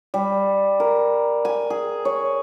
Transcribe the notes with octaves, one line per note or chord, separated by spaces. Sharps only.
G3
A#4
G#5
G#4
C#5